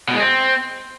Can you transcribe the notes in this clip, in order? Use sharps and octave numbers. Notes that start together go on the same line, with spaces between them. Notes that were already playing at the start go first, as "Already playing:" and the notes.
B2
G#3
C4